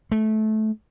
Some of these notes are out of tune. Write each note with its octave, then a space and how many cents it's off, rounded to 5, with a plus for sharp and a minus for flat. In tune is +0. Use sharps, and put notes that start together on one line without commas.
A3 -20